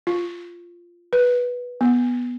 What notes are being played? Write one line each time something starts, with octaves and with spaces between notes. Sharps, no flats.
F4
B4
B3